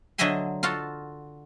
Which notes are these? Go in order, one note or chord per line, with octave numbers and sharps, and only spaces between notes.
D3 F#3 D#5 E5 G#5 C6
F4 F#4 A4 F5